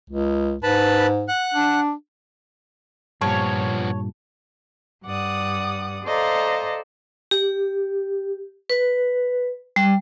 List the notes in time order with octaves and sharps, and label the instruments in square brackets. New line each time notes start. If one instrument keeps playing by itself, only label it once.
[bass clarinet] C#2
[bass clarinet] G#2 [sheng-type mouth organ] B4 A5 B5
[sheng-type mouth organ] F#5 F#6
[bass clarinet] D4
[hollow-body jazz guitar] G2 A#2 [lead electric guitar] F3 B3 [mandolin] C#5 [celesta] A5
[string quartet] G2 D5 F#5 D#6
A4 C5 D5 D#5 F5 A#5
[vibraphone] G4
B4
G3